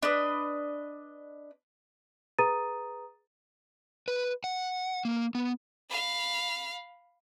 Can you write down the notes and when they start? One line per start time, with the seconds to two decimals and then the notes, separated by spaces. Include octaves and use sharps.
0.03 D4 B4 D#5
2.38 G#4 B4 A#5 D#6 A6 D#7
4.08 B4
4.44 F#5
5.05 A#3
5.35 B3
5.90 F5 B5